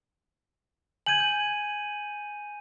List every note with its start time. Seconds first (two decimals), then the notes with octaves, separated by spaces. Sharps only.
1.06 G#5 G6 G#6 D#7 F#7
1.20 G6